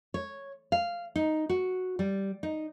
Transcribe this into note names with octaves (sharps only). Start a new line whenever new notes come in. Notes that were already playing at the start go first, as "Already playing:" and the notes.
C#5
F5
D#4
F#4
G3
D#4